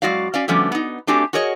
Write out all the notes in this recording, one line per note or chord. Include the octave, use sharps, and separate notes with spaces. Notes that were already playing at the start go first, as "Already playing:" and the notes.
F#2 G#3 F#4 D5 F5
C#4 D5 F5
D3 F3 G3 A3 B3 C#4
B3 D#4
A3 C4 D4 F#4 G4 G#5
F#4 G#4 A#4 C#5 D#5